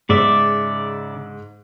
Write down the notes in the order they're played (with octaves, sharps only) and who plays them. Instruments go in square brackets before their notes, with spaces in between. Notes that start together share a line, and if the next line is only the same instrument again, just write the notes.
[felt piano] G#2 [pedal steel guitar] C#3 D5 E5